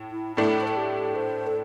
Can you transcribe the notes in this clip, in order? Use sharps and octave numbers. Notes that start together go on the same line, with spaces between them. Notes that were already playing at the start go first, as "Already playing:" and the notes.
Already playing: A2
E4
A2 A3 D4 E4
C5
A4
G4
C5
A4